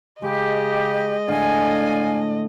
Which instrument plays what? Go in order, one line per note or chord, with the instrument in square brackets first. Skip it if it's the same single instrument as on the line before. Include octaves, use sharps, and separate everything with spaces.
[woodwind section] C#3 G4 [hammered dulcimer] G#3 [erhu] D#5
[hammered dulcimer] A2 D3 A3 [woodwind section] D5 F5 G#5